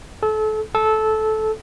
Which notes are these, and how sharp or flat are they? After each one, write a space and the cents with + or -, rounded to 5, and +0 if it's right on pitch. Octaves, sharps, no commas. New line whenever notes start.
A4 -30
A4 -15